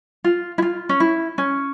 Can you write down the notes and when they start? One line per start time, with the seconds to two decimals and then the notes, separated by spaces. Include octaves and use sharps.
0.24 F4
0.58 E4
0.62 F4
0.89 C#4
1.00 E4
1.38 C#4